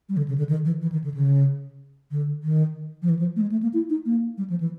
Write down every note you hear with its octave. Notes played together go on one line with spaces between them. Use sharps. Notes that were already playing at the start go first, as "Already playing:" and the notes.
G3
D3
C#3
D3
D#3
E3
E3
D#3
D3
C#3
D3
D#3
F3
E3
F3
A3
G#3
A3
A#3
E4
D#4
A#3
G3
F3
E3